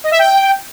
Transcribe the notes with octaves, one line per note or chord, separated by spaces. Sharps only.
D#5
E5
G5